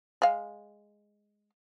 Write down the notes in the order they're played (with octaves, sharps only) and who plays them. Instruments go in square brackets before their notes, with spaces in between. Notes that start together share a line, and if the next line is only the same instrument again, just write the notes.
[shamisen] G#3 F5